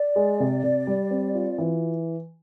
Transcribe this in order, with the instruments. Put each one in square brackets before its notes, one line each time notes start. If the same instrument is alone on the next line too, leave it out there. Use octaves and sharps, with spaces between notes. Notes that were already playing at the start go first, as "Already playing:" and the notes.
Already playing: [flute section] D5
[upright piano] G#3
C3
C3
G3
C4
F4
E3